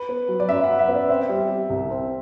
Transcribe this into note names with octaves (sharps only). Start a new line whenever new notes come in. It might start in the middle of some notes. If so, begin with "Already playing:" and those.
Already playing: B4
B3
F#3
D5
F#2 E5
F#5
F#2
E5
B3
D5
C4 E5
G3
G3
C2
C4